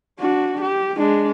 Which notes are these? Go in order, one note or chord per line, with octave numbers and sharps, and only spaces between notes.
D4 F#4
G4
G#3 D4